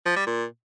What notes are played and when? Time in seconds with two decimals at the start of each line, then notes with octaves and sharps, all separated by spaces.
0.06 F3
0.16 G3
0.26 A#2